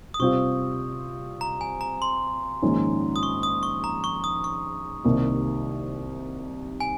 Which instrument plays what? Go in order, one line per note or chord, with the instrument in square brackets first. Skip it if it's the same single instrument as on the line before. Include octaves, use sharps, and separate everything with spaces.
[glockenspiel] D#6
[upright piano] C3 G3 C4 F4 [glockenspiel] C#6
[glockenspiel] A#5
G#5
A#5
C6
[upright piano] A#1 G#2 D#3 G#3 C#4
[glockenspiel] D#6
C#6
D#6
C#6
A#5
C#6
D#6
C#6
[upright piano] C2 C3 D#3 A#3 D#4
[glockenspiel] G#5